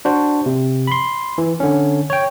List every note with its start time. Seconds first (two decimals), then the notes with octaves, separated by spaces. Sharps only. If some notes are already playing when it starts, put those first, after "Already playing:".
0.05 D4 F#4 C5
0.46 C3
0.87 B5 C6
1.38 E3
1.60 D3 C#4
2.10 C#5 G5